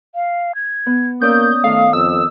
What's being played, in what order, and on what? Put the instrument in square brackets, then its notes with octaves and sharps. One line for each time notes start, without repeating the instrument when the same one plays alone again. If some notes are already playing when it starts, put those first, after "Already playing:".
[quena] F5
G#6
[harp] B3
[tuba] A#3 [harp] C#4 D5 E6 [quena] D#6 [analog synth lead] G6
[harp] D#3 A4 [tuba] A3 [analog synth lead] F5
[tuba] F2 [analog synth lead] E6